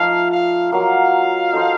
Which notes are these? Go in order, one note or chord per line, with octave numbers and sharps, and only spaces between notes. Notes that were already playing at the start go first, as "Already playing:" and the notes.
Already playing: F3 A3 D#4 A4 F5
F5
F#3 A#3 F4 F5
D#4 A4 C5 D#5